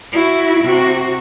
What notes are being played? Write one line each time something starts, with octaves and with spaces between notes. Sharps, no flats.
E4 F#4
C3 F#4